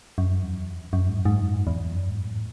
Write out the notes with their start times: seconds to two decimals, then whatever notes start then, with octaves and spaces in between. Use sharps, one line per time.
0.18 F#2
0.43 E2
0.93 F#2
1.09 G#2
1.25 G#2
1.42 F#2
1.67 E2
1.92 F#2
2.09 G#2
2.24 A2